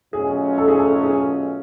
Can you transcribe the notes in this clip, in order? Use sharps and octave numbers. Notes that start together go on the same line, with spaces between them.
B2 F#3 A3 C#4 F4 G#4
A4
G#4
A4
G#4